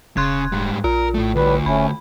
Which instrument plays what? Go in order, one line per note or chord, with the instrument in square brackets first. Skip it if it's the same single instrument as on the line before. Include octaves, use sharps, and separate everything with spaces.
[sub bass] E1 [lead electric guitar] C#3 [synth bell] C6 F#6 G#6
[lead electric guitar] G#2 G3
[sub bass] A#1 [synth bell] F4 [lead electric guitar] A#4
[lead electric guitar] A2 A3
[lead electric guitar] D2 [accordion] A2 G3 B4
[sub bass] F#1 [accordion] A3 C#4 [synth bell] B5